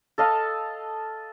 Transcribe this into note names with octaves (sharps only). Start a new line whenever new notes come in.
A4 D#5 F5